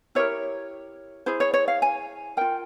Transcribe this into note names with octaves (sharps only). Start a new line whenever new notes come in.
E4 G4 A#4 C#5
E4 G#4 C5
C#5
C#5
F5
G#5
F4 A#4 G5